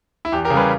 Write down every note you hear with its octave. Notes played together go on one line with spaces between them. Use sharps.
E4
E2 G4
G4 A#4
C#3
G3 G#4 B4